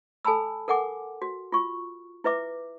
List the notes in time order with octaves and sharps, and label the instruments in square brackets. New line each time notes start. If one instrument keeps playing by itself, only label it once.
[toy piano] A4 G#5 A5 B5 E6
A4 A#4 F#5 G#5 D6
F#4
F4 C#6
E4 B4 E5 D6